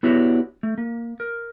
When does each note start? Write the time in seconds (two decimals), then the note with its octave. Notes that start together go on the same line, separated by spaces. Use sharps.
0.03 B3 D4 E4 F#4 G4 C#5
0.63 A3
0.78 A#3
1.20 A#4